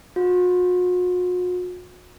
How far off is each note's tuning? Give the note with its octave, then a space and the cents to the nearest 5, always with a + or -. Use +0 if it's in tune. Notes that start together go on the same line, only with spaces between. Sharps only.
F#4 -45